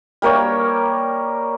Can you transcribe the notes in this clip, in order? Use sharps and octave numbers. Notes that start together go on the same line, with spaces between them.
G3 A#3 A#4 C#5